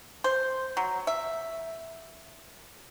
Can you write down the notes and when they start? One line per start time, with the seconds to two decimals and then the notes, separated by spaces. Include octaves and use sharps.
0.24 C5
0.77 F#3
1.07 E5